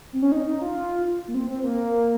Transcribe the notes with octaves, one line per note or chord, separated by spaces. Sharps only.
C4
C#4
D#4
D#4
F4
A#3
C4
C4
A#3